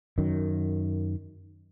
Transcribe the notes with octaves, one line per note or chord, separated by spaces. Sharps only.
F#2 D#3